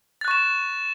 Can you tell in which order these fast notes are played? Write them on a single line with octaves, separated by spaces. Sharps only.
A6 F#6 C#6 E7